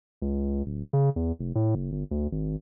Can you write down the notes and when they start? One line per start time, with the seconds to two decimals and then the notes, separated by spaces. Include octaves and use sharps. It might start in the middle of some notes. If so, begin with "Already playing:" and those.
0.22 C#2
0.66 D1
0.93 C#3
1.16 E2
1.39 F1
1.55 A2
1.75 F#1
1.92 G1
2.11 D2
2.32 G#1